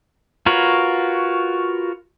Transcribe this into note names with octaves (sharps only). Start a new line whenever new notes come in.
F4 F#4 A#4 B4 C#5